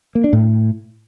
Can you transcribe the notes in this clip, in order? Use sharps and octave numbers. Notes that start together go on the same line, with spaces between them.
A#3
D4
A2